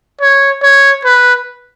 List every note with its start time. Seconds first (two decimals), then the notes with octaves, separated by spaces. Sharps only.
0.22 C#5
0.63 C#5
1.05 B4